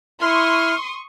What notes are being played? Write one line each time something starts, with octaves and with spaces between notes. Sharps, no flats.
E4 C6 C#6 D#6 F6